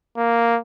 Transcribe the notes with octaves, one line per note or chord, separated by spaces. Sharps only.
A#3